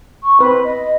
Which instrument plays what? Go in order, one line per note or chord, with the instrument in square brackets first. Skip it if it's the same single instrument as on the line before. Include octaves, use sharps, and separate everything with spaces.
[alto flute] C#6
[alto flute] C4 [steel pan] B4
[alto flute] D#5